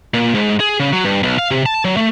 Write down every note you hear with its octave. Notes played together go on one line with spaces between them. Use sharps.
A#2
G#2
G#4
C#3
F#3
G2
B1
F5
C3
A5
F#3
A3